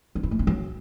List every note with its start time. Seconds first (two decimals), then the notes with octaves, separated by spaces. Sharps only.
0.15 D4
0.23 E4
0.31 A3
0.39 D4
0.47 F#3